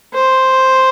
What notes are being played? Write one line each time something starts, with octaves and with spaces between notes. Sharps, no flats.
C5